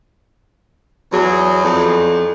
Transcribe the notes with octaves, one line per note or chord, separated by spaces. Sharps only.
E2 F#3 G#4
F2